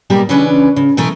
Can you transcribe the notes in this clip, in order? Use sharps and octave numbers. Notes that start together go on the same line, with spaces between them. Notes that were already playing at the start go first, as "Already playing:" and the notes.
B2 G3 A#3 G4
C#3 E3 C#4 D4 B4
C#3
B2 E3 A3 A4 A#4